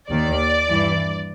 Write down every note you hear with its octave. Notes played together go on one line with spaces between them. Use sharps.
D#2 D#3 D5
G2 E3